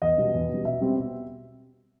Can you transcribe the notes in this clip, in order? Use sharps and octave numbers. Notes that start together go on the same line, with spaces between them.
E2 D#5
B2 G3
E2
B2 G3
B2 E5
G3 C4
B2